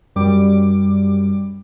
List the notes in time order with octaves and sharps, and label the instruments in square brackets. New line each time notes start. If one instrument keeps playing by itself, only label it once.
[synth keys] F#2 G3 D6